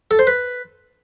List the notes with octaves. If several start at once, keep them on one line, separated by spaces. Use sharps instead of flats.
A4
C5
B4